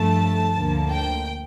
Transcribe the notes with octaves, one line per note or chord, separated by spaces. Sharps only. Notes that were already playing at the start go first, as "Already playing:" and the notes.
Already playing: G2 F3 A3 A5
D2 D3 F3 A#3
G5